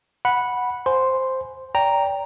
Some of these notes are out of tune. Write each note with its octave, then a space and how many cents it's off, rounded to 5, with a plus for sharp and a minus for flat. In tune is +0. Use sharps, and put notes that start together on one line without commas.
F#5 -5 B5 -5
C5 +0 G#5 +5 C6 +0
D5 -30 G5 +5 A#5 +0